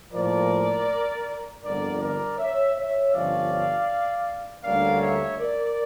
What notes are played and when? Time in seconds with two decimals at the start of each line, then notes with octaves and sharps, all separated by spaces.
0.13 A2 F3 A#3 A#4 D5
1.63 G1 F2 D3 A#4 D5
2.01 A#4 D5
2.38 C#5 E5
2.76 C#5 E5
3.13 G1 G2 F3 C#4 D5 F5
4.64 D2 D3 G3 A#3 C#4 D5 F5
5.01 C#5 E5
5.39 A#4 D5